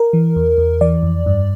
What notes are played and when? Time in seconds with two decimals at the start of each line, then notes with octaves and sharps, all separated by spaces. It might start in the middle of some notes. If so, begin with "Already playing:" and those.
Already playing: A#4
0.13 E3
0.36 E2
0.58 E2
0.81 E3 D5
1.03 F2
1.26 G2